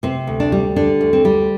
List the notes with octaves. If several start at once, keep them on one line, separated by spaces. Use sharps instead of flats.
C3 C4
D2
D4
G3
D3 D4
D2
C4
G3